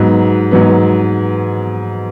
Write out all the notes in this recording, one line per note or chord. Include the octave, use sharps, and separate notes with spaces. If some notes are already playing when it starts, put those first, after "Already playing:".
Already playing: G#2 F#3 B3 B4
G#2 F#3 B3